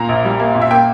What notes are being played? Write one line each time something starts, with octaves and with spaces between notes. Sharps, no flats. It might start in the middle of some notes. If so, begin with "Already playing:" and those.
Already playing: A#2 A#3 A#5
A#1
G3
A#3
A#2
E5
A#3 G5